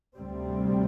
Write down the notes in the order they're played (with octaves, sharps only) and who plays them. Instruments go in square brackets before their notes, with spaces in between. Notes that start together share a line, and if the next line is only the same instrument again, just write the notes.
[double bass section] D2 C3 G3 C4